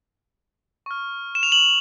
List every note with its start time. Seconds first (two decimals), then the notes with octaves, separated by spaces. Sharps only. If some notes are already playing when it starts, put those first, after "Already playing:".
0.86 C#6 F6
1.35 E7
1.43 F7
1.52 F#7